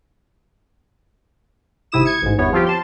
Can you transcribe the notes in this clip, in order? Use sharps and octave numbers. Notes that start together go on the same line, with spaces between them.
G#1 C3 E4 D#6 E7
G#6 C#7
A1 G#2
G1 E2 B3 C#5
F3 C4 F4 G4
A5 C6